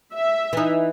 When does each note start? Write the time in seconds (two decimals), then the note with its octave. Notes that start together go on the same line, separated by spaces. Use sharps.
0.14 E5
0.53 E3 D#4